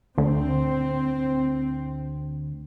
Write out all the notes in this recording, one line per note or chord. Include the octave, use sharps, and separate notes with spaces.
D2 C4